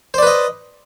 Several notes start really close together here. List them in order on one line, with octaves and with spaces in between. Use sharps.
C5 D5 B4 D#5